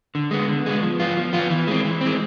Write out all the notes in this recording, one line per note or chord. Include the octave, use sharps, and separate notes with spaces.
D3
G#3 B3
D3
G#3 B3
F3
B3 F4
F3
B3 F4
E3
G#3 C4
E3
C4
G#3